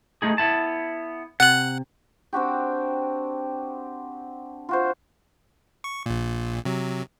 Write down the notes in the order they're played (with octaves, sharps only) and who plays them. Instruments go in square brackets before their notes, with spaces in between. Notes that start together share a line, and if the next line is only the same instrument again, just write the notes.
[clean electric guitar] A3 D#4 G#4
B3 E4 A5
[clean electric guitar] C3 [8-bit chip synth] F#5 F#6
[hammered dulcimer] C4 D4 F#4 G4
F4 F#4 C5
[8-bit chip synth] C#6
A#1 A#2
C3 F#3